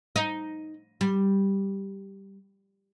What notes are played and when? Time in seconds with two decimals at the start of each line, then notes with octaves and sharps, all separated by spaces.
0.16 D#4
1.01 G3